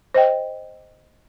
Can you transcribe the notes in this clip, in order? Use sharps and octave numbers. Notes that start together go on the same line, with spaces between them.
C5 D#5 G5